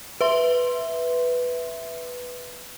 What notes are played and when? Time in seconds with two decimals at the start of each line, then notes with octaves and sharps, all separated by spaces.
0.21 B4 E5 C6